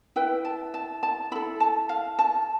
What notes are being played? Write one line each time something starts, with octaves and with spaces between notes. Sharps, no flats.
E4 B4 G5
A5
A5
A5
E4 A4 B5
A5
F5
A5